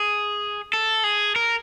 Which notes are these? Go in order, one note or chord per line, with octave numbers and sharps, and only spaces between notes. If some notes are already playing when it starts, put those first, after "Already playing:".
Already playing: G#4
A4
G#4
A#4